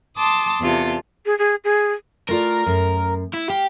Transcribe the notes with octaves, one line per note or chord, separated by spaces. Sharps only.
A5 C6 D6 D#6
E2 C3 F4 A4
G#4
G#4
G#4
A3 F4 A#4 D5
F#2
E4
G4 F5